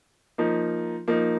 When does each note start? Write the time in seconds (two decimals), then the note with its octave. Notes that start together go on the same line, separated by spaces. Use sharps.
0.38 F3 A#3 D#4
1.08 F3 A#3 D#4